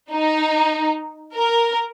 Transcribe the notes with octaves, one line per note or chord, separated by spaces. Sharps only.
D#4
A#4